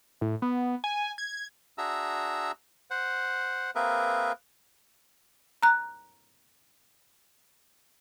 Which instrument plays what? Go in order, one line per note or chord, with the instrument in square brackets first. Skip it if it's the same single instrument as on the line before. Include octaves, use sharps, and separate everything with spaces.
[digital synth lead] A2
B3
G#5
G#6
[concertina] D4 F#4 G#4 E5 A#5 E6
C5 F#5
A#3 C4 G#4 A#4 B4 E5
[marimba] A#5 F#6